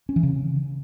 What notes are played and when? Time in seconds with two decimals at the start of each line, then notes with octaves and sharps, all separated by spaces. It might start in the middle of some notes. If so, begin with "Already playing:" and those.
0.09 C#4
0.16 E3
0.23 C#3